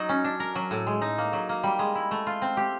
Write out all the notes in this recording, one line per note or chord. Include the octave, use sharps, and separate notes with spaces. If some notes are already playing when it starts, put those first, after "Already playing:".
Already playing: F#3 D#4
C#4
D4
A#4
F#3
A2
G#3
D#4
A#3
F#3
A#3
G3
G#3
E4
A3
F4
C4
G4